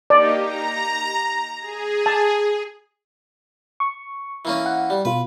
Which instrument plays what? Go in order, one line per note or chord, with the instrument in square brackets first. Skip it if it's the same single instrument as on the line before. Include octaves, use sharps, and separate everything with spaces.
[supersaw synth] A#3 D#4 G4 [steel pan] D5
[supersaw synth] A#5
G#4
[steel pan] A5
[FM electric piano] C#6
[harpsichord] E3 A#3 C#4
[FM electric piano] F#5
[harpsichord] G3
[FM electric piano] B2 F4 [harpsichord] B4